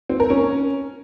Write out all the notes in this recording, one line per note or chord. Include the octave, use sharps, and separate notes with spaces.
C4
A#4
C#4